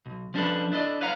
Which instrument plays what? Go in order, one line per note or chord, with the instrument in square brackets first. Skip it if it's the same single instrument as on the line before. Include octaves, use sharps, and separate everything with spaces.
[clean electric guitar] B1
F3 C#4 D4 G4 A4 B4
D4 E4 A4 D5 D#5
B4 C#5 F5 F#5 A#5